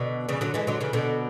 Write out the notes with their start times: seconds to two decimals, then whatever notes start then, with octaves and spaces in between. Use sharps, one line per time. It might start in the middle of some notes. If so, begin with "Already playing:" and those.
Already playing: B2 D3
0.29 C#3 E3
0.41 D3 F#3
0.54 E3 G#3
0.67 D3 F#3
0.81 C#3 E3
0.93 B2 D3